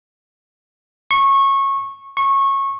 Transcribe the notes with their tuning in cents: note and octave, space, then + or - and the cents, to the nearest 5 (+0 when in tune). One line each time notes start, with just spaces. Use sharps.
C#6 -20
C#6 -20